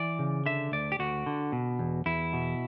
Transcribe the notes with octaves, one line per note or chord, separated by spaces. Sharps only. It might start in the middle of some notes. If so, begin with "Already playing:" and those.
Already playing: E3 D5
C#3
D3 E5
D2 D5
G4
D2 F#4
D3
B2
E2
E2 E4
B2